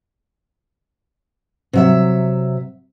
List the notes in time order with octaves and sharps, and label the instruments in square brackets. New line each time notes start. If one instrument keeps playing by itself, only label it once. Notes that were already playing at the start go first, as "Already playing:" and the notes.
[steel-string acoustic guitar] C3 F#3 E5